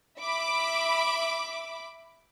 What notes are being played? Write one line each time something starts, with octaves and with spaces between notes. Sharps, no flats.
E5 B5 D6